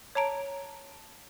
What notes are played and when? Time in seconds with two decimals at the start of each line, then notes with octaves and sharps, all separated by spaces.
0.15 C#5 A5 A#5 D7